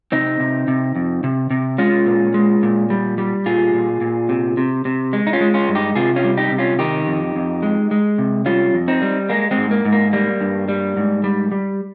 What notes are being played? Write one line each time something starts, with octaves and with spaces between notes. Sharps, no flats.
C3 C4 D#4
C3
C3
F2
C3
C3
G#3 C#4 F4
A#2
G#3
A#2
G3
G3
A#2 F4 G#4
A#2
A#2
C3
C3
C3
G#3
D#4
C#4 F4
G#3
C#4 F4
G2
D#4 G4
C3 F4 G#4
C#4 F4
G3
D#4 G4
C3
C#4 F4
D#3 D#4 G4
F2
F2
G#3
G#3
C3
G3 C#4 F4
F2
C4 D#4
G3
G#3 A#3
G#3 C4
G#2
A#3
G#2
A#3
G3 A#3
G2
G3
G#2
G3
G3